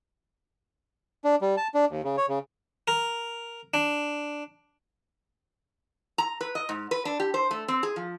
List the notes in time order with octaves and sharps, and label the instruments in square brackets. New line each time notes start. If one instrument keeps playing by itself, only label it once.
[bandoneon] D4
G3
A5
D4
D#2
C#3
C#5
C#3
[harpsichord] A#4
D4
[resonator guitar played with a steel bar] A#5
B4
D#5
G#2
B4
D4
G4
C5
A3
C4
G#4
F3